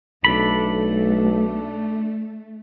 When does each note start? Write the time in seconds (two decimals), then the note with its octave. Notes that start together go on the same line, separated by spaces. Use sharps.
0.25 B1 A3 D4 A4 B5